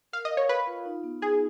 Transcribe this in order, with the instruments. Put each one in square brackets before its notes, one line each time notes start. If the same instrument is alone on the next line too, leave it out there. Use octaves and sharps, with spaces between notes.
[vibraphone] A#4 [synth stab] F5
[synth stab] D#5
[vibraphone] F5
[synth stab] C#5
[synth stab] B4 [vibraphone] F5
[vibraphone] F4
D#4
B3
[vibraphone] D#4 [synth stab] G#4